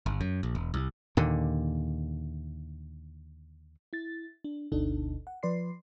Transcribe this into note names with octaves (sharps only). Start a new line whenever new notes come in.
G1
F#2
A#1
E1
C2
D#2 A#2 D3
E4 A6
D4
G1 D2 B2 D4 D#4 A4
F#5
F3 B4 D5 C6 C7